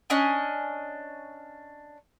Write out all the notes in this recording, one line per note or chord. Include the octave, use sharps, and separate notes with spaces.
C#4 D4 D#5 G#5